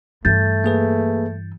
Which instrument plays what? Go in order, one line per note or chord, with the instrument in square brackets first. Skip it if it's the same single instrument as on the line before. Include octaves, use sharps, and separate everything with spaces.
[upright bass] G2 E3 [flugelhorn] A3 [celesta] G6 A6
[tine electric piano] A#3 G#4 B4